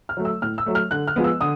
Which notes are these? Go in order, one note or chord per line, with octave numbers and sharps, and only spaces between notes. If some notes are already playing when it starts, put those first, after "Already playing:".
F6
F#3 A3
E6
A2 F6
E6
F#3 A3
F6
D3 F#6
F6
F3 G#3 B3
E6
D3 D#6